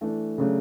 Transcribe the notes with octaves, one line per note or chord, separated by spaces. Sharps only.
E3 A3 D4
C#3 F#3 A3 D4